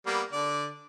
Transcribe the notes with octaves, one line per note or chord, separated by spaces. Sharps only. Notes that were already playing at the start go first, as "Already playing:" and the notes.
G3 A#3 B3
D3 D5